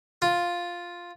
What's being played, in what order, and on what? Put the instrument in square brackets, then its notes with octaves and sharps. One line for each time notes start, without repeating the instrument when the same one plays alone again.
[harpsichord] F4